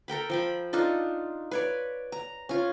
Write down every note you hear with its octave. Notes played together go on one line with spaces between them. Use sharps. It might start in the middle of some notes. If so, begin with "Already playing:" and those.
A4 A#4 G5 B5
F3 G5 B5
D4 D#4 F4 A4
B4 C#5 D5
A#5
C#4 F4